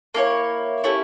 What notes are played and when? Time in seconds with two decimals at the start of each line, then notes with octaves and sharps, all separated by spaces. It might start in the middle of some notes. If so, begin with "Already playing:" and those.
0.14 A#3 E4 A#4 C#5
0.84 A3 C#4 E4 G4